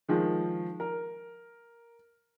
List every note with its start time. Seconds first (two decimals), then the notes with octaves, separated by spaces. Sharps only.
0.09 D#3 F3 G#3
0.80 A#4